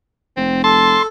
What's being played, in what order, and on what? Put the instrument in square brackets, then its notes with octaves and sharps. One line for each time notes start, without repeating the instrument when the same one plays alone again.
[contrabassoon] F1 [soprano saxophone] C4
[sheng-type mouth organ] A4 [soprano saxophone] A5 [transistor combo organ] C6